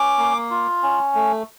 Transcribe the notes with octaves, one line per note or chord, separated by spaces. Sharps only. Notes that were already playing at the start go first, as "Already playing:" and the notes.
Already playing: C#4 D6
A#3
F4
C#4
A3